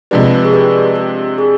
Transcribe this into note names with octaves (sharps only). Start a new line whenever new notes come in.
C3 F3 G#3 D4 G4 B4
G#4
G4 B4
G4
G#4